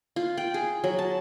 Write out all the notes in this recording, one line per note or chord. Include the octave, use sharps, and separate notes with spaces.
F4
G5
G#4
F#3
A5